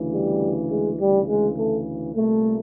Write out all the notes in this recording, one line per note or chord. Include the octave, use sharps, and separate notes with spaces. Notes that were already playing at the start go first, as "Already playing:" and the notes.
Already playing: D2 C#3 E3
G3
G#3
D2 C#3 E3 G3
G#3
A3
C2 A#2 A3